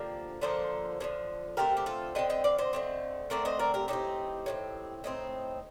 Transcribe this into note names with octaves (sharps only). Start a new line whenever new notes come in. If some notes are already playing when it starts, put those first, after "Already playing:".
Already playing: D3 F3 A#3 G4
D3 F3 A#3 A4 C5
D3 F3 A#3
D3 A3 C4 G4 A#4
G4
F4 A4
D3 A3 C4 D#5 G5
D#5 G5
D5 F5
C5 D#5
D3 A3 C4
D3 A3 C4 A#4 D5
C5 D#5
A#4 D5
G4 A#4
A2 A3 C4 D#4 G4
A2 A3 C4
A2 A3 C4 D#4